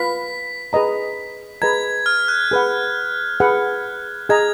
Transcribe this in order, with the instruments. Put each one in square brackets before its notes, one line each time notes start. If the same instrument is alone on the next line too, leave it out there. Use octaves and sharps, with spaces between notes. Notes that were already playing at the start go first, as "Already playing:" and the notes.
Already playing: [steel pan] F4 B4 F5 B5 [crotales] B6
[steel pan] G#4 B4 D#5 A#5
[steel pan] G#4 B4 D#5 A#5 [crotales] G#6
[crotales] F6
F#6
[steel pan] G#4 B4 F#5
G#4 B4 F#5
[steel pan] G#4 D#5 A#5 [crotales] G#6